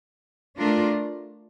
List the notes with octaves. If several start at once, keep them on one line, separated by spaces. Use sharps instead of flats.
A3 D4 F4 A#4